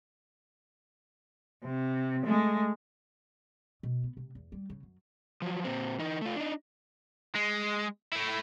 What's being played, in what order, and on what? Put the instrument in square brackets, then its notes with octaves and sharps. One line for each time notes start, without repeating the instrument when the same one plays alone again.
[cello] C3
G#3 A3
[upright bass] B2
B3
C3
E2
G3
C#3
F#2
[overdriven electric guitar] F3 F#3
A#2 C4
E3 D#4
A3 F4
D4 D#4
G#3
A3 E4